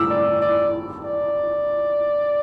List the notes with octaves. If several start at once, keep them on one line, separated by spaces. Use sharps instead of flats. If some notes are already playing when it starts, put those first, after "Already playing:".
Already playing: D6 E6
D5
D5
D5